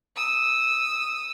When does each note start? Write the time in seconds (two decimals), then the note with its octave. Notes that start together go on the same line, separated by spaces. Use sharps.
0.16 D#6 E6